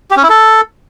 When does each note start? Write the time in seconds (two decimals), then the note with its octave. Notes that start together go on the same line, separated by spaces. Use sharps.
0.11 G4
0.17 C#4
0.23 E4
0.30 A4